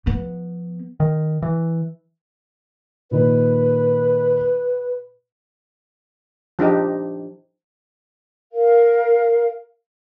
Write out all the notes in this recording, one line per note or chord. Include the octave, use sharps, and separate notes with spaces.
F3 B3
D#3
E3
A#2 D#3 B4
F3 D4 D#4 G4
A#4 F5